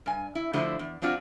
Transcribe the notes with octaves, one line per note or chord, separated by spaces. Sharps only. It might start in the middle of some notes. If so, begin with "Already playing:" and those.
G2 G#5
E4
D3 F3 A3 E4 F#4 C5
E2
F#3 C4 D4 F4 F#4